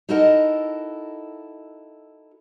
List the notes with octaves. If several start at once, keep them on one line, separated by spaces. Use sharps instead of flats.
D#4 E4 F#4 A4 A#4 D#5